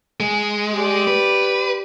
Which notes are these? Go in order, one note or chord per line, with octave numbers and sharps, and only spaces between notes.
G#3
G4 D5
B4